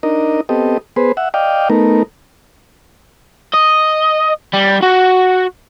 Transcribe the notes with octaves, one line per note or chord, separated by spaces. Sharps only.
D4 D#4 A#4 D#5
B3 C4 G4 A4 D#5
B3 G#4 B4 C5
E5 F#5
D5 D#5 F5 G5
A3 B3 D#4 A#4
D#5
G3
F#4